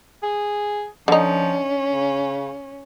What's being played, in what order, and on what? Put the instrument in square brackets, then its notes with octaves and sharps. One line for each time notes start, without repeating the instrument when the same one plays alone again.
[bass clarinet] G#4
[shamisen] D3 D#4 [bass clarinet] F3 [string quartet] C#4
[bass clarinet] C#3